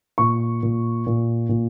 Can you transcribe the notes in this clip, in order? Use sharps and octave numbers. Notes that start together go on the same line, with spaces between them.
A#2 C#6
A#2
A#2
A#2